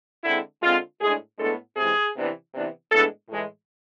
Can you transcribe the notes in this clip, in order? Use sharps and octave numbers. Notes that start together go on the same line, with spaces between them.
D3 G#3 C4 E4
D3 G#3 C4 F4
A2 G#3 D4 G#4
A2 G#3 B3 D4 A4
C3 E3 G#3 G#4
C3 E3 B3 D4
C3 E3 B3 D4
A2 E3 G#3 B3 D4 A4
A2 E3 G#3